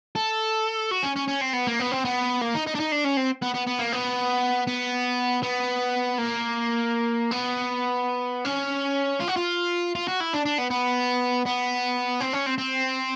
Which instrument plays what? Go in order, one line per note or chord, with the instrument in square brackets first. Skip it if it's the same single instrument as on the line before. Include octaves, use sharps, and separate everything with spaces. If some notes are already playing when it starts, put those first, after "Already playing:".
[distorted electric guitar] A4
F#4
C#4
C#4
C#4
C4
B3
A#3
B3
C4
B3
A#3
D#4
D#4
D4
D#4
D4
C#4
C4
B3
B3
B3
A#3
B3
B3
B3
A#3
B3
C#4
F4
F#4
F4
F4
F#4
E4
D4
D4
B3
B3
B3
C4
C#4
C4
C4